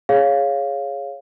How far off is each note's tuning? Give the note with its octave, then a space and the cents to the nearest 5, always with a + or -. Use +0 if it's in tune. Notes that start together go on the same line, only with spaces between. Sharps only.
G#4 +0 C#5 +0 F5 +0